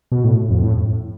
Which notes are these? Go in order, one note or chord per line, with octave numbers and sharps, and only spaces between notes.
B2
A2
F2
A2